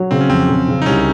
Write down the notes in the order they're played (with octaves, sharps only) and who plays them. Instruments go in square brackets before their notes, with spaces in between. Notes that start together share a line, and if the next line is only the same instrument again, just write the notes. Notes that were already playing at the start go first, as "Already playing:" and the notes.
Already playing: [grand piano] F#3
[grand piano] C#3 [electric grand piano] C4
[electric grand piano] C#4
[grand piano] F2 [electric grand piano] C4
[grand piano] C#3
C#3
[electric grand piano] D#4
[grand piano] C2 [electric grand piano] C#4